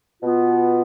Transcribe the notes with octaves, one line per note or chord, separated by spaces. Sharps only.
B2 B3 F4